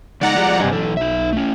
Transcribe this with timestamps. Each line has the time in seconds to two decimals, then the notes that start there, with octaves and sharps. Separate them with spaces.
0.21 C#3 G#3 D#4 D5 F#5 A#5
0.36 F3 G3 G#3
0.60 G2 C3 D#5 F#5 G#5
0.72 B1 E3 A4
0.97 D#4 E5
1.33 A3 C#4